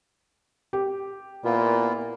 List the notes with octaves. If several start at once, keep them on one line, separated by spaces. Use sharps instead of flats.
G4
A#2 B3 E4 F4